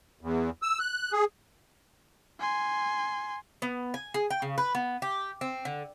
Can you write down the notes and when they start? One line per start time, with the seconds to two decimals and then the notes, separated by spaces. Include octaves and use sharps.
0.21 E2
0.62 E6
0.79 F#6
1.12 G#4
2.40 G#5 C6
3.62 B3
3.94 G#5
4.14 G#4
4.30 G5
4.42 C#3
4.58 B4
4.75 B3
5.02 G4
5.41 C4
5.65 D3